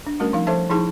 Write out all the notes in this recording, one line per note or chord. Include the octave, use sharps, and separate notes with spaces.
D4
G3 A3 C#4 F#4 A#4
F3 D#4 F5
F3 A4 C5 E5 A5
F3 D#4 E4 G#4 A5 C#6